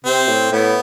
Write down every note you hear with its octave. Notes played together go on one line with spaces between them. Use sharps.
C3 C4
A2
A2 B3